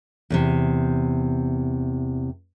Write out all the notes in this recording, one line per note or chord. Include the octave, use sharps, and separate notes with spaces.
E2 A2 C3